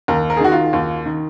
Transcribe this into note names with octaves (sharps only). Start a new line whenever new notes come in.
D#2 A#4
A#4
G#4
D#3 F#4
F4
D#2
D#3